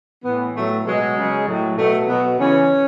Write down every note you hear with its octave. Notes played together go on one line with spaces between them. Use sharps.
A2 E3 B3
A2 F#3 A3
B2 F#3 G#3
C#3 F#3
A2 F#3
B2 F#3 A3
B2 F#3 B3
C#3 E3 C#4